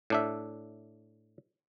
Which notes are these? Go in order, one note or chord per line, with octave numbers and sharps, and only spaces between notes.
A2 D4 E5